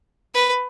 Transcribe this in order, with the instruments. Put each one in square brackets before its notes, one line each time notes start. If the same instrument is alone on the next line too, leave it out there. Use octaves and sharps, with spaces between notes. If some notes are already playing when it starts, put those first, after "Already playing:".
[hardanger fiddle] B4